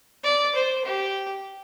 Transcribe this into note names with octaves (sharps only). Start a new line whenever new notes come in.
D5
C5
G4